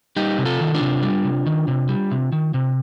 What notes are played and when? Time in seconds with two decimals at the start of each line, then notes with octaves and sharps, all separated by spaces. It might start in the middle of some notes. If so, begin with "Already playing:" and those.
0.16 G3 D#4 G4
0.38 C3
0.45 F4 A4
0.61 D#3
0.75 D4 F4
0.81 C3
1.03 G3
1.24 C3
1.46 D#3
1.68 C3
1.89 G3
2.11 C3
2.32 D#3
2.54 C3